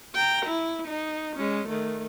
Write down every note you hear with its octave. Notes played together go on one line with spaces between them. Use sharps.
G5 A#5
E4
D#4
G#3 C#4
D#3 A3